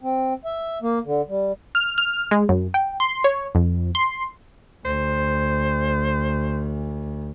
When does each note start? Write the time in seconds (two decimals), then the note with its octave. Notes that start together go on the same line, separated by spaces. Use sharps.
0.03 C4
0.45 E5
0.82 A#3
1.05 D3
1.28 G3
1.75 F6
1.98 F6
2.31 G#3
2.49 F#2
2.74 G5
3.00 C6
3.24 C#5
3.55 F2
3.95 C6
4.85 D2 C5